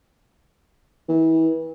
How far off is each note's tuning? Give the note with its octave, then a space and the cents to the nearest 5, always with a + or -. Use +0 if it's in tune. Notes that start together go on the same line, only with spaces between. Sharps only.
E3 -30